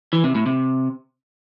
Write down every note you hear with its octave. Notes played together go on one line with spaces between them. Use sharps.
E3
C3
A2
C3